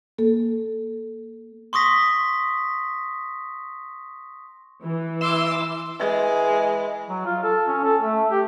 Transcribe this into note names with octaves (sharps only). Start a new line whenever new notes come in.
A#3 A4
C6 C#6 D#6 A#6 B6
E3
E5 C6 D6 E6
E3 G#3
F#3
F4
A4
C#4
A4
A3
G4